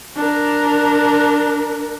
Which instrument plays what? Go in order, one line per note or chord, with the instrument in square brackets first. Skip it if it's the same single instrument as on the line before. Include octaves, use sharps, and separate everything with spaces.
[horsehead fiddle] D4 A#4